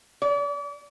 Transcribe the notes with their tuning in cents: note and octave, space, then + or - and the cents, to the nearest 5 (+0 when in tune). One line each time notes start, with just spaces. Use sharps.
D5 -40